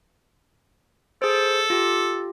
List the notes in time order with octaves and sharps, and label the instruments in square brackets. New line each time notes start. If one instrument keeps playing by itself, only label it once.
[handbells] G#4 C5 [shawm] A4
[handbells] F4 G4